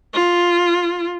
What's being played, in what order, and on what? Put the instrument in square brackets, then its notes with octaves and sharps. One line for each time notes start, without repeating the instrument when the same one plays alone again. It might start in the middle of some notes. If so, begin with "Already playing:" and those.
[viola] F4